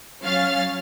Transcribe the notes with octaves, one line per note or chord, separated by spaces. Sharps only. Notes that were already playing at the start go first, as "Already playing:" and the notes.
F#3 C#4 C#5 F5 F6 A6